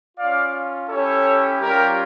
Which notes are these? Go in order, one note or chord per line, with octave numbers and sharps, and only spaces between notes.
C#4 F4 D5 F5
C#4 E4 G4 A4 C#5
G3 C#4 F4 G4 A#4